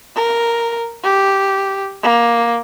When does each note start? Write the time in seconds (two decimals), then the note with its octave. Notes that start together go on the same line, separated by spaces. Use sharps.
0.16 A#4
1.04 G4
2.03 A#3